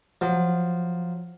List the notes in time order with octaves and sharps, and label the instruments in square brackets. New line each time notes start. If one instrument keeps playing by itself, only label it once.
[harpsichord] F3 F#3